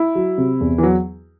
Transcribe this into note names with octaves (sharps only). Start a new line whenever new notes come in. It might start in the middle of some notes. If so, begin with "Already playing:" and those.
Already playing: E4
F#3
C3
E2
E3
F#3